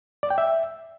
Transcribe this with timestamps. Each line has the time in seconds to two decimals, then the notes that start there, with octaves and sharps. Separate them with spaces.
0.23 D5
0.30 G5
0.38 E5